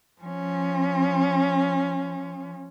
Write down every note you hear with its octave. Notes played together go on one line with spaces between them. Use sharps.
F3 C#4